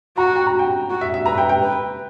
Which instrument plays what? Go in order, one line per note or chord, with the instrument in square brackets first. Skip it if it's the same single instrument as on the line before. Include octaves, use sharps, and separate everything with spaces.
[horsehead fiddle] F#4 [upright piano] A#5
[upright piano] G5
A#5
G5
[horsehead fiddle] F#4
[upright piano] E5
E5
[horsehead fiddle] B4 [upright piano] A#5
[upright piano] G5
G5
[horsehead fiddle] B4